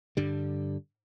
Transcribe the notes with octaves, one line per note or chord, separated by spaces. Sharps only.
G2 D3 G3